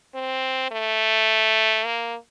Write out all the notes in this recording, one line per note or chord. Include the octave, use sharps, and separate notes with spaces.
C4
A3
A#3